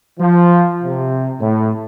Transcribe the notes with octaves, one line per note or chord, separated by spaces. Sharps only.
F3
C3
A2